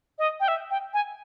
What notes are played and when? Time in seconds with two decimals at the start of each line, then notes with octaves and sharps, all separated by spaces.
0.18 D#5
0.40 G5
0.48 E5
0.70 G5
0.93 G#5